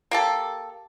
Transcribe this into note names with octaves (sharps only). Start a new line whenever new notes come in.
A#3 G4 A4